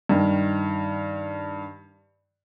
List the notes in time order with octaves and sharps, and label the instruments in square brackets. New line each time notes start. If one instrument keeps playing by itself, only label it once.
[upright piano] G2 D#3